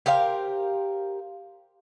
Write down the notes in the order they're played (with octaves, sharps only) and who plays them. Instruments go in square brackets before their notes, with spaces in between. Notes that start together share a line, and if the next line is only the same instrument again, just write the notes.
[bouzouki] G4 A#4 C5 F5